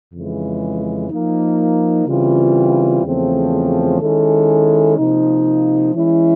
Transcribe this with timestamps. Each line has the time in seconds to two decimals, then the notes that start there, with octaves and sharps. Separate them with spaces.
0.13 F2 C#3 E3 G#3
1.10 F3 A#3 D#4
2.07 C#3 E3 G3 C4 F4
3.04 E2 C#3 F3 A3 C4
4.00 D#3 G#3 C#4 E4 A4
4.97 C3 F3 A#3 D#4
5.94 E3 G#3 C#4 E4